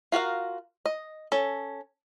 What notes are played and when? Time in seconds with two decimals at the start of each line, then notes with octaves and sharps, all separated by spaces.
0.12 F4 F#4 A#4 F5
0.86 D#5
1.32 C#4 A4